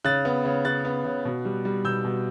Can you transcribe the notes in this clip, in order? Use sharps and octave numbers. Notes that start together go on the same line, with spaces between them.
C#3 F#6 A6
B3
C#3
C#3 F#6 A6
B3
C#3
B2
G3
G3
B2 E6 G6
B2